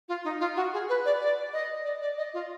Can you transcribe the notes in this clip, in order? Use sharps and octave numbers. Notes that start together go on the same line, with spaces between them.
F4
D#4
F4
F#4
G#4
B4
D5
D5
D#5
D5
D5
D#5
F4